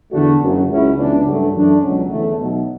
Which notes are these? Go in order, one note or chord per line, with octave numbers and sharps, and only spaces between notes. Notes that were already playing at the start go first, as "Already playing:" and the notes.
E2 D3 A3 D4 F#4
F#1 F#2 C#3 F#3
C#2 C#3 F#3 C#4 E4
C#2 C#3 E3 B3 D4
G2 F#3 A3 D4
F#2 E3 A3 D4
C#2 B2 F#3 C#4
E2 D3 A3
B1 B2 F#3